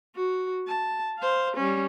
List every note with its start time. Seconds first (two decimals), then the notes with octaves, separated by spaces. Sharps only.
0.15 F#4
0.67 A5
1.19 C5 F5
1.57 G3 C#4